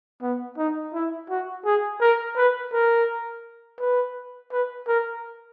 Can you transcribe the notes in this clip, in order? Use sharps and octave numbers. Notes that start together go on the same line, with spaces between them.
B3
D#4
E4
F#4
G#4
A#4
B4
A#4
B4
B4
A#4